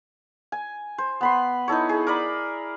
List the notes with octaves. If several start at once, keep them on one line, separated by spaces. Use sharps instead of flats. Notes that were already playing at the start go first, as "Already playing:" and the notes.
G#5
C5
B3 B5 C6
D#4 E4 A4 C#5
G#4
A#4 D5 B5